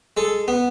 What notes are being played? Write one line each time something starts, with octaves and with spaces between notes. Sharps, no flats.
G#3 A4
B3